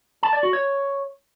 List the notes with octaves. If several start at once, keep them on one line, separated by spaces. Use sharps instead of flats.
A5
D5
F#4
C#5